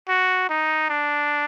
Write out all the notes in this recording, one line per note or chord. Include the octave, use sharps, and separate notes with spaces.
F#4
D#4
D4